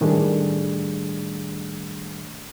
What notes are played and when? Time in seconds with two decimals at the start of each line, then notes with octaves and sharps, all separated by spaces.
0.01 A2 D#3 G3 A3 D4 G#4